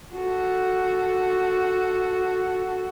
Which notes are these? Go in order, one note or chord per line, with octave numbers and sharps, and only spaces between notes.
F#4 A4